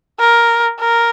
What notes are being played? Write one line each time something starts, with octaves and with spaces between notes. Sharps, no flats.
A#4
A#4